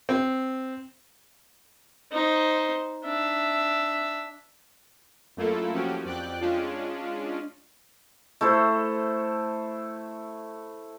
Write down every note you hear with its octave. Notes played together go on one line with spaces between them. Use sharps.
C4
D#4 C5
D4 E5
F#2 A3 A#3 E4 F4 A4
F3 C#4 F#4 G4
F2 D5 G5 F#6
G#3 C#4 D4 F4
A3 E4 A4 C5